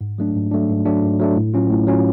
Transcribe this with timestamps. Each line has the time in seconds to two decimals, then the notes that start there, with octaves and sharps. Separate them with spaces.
0.01 G#2
0.18 F#3 A3 D4
0.35 G#2
0.51 F#3 A3 D4
0.69 G#2
0.86 F#3 A3 D4
1.02 G#2
1.20 F#3 A3 D4
1.36 A2
1.54 F#3 C#4 F4
1.70 A2
1.87 F#3 C#4 F4